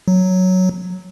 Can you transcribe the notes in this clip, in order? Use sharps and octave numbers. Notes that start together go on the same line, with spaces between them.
F#3